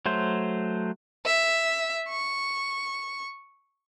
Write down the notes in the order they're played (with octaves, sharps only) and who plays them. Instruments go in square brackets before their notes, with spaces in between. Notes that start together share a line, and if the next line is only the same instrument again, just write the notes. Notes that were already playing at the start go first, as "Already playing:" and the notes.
[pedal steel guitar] F#3 A3 C5
[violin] E5
C#6